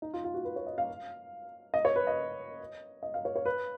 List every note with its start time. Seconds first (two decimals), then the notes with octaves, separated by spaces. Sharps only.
0.02 D#4
0.14 F4
0.24 F4
0.34 F#4
0.45 B4
0.56 C#5
0.67 D#5
0.78 F5
1.74 D#5
1.85 C#5
1.96 B4
2.07 D#5
3.03 D#5
3.14 F5
3.25 C#5
3.36 C#5
3.46 B4